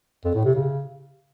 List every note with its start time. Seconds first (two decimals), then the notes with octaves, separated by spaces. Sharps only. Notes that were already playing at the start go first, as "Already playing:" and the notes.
0.24 F2
0.34 A2
0.44 C3
0.54 C#3